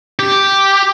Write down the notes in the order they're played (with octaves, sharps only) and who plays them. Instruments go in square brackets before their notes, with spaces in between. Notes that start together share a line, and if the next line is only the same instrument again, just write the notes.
[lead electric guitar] G4